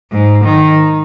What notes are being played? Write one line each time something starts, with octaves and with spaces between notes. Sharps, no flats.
G#2
D#3